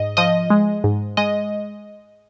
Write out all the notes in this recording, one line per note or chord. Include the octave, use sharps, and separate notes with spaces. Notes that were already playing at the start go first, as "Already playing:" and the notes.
Already playing: G#2 D#5
F3 D#5
G#3
G#2
G#3 D#5